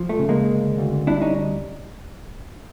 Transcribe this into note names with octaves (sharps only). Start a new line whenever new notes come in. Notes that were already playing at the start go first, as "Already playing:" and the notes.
Already playing: F3
A3
C#3
G#3 A#3
D2
D2
G3 D4 E4
C#4 D#4